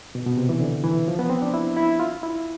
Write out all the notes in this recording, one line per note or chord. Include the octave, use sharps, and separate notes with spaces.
B2
B2
C3
E3
D3
E3
F3
B3
C4
D4
E4
E4
F4
E4